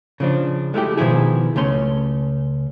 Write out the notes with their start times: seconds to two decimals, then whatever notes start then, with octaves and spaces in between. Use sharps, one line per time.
0.20 C#3 F3 D4
0.74 G#3 A3 E4 G4
0.98 B2 D#3 F3 E4 G#4
1.56 C#2 A3 C#4 C6